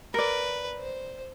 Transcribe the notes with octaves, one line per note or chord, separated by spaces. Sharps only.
A#4 B4 D5
C5